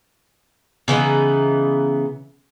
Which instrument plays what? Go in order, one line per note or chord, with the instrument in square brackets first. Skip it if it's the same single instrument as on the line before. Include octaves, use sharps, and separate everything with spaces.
[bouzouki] C#3 E3 B3 D#4